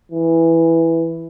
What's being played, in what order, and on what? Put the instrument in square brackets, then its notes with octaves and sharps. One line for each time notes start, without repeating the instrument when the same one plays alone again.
[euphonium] E3